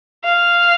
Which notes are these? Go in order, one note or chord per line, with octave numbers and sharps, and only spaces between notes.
F5